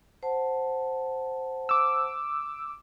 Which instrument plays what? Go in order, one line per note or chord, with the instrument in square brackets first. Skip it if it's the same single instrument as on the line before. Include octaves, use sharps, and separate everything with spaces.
[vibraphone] C5 F#5 A5
[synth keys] D6 E6